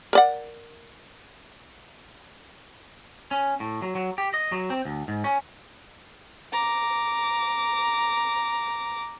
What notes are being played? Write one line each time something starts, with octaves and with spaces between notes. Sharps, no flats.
A#4 D5 F#5
C#4
A2
F#3
F#3
G4
D#5
F#3
C4
D2
G#2
C#4
A#5 D6